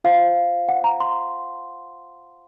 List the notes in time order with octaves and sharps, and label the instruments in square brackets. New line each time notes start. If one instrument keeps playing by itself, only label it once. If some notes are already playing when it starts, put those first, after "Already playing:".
[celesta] F4 C5 F5
F#5
A#5
C6